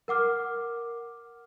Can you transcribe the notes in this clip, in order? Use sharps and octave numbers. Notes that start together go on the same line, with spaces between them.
A#4 F#5 D6 F6